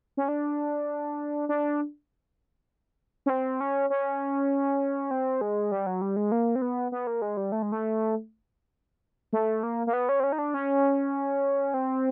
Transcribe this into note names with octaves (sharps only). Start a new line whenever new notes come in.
C#4
D4
D4
C#4
C4
C#4
C#4
C4
G#3
G3
F#3
G3
G#3
A#3
C4
B3
B3
A#3
G#3
G3
A3
G#3
A3
A3
A#3
A#3
B3
C#4
C4
C#4
D#4
D4
C#4
C4